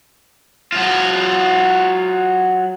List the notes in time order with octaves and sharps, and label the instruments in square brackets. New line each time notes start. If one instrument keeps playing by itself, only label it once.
[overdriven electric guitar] F#3 F4